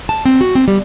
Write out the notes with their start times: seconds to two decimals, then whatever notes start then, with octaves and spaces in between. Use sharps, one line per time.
0.09 A5
0.25 C4
0.41 F#4
0.55 C4
0.68 G3